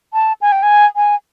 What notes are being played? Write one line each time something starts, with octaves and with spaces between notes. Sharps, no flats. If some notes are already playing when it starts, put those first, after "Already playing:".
A5
G#5
G5
G#5
G#5